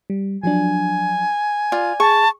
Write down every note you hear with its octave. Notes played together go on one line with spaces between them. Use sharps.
G3
F3 F#3 D4 G#5
F4 D5
G#4 A5 C#6